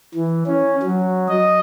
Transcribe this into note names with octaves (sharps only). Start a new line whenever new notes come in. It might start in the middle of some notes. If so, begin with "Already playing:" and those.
E3
C#4
F#3
D#5